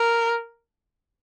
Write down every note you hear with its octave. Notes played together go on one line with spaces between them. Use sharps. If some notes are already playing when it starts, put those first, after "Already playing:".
Already playing: A#4